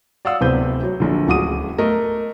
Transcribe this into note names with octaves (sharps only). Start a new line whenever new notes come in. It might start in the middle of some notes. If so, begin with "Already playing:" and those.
D5 F5 F#5 D#6 E6
D1 C3 B3 B4 C5 G6
F#3
A#1 D3
D1 C#2 F#4 D6 D#6 D#7
A3 A#4 D#5